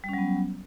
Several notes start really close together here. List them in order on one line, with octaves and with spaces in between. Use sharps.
G3 C#4 F#3 B3